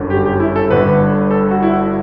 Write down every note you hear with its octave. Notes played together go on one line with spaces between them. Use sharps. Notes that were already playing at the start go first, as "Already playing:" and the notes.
Already playing: G1 F#2 D3
G4
G4
E4
A4
G1 G2 D3 B4
A4
F#4
E4
F#4